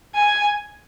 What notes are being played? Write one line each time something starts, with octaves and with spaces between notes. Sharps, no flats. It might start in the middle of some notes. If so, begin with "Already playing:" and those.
G#5